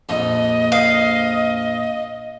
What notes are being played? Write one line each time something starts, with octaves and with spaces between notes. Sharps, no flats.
A#1 F2 D#5
F5